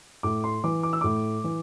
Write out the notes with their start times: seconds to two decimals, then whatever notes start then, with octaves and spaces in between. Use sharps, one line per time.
0.23 A2 D6
0.44 C6
0.64 E3 D6
0.83 D6
0.93 E6
1.01 A2 D6
1.44 E3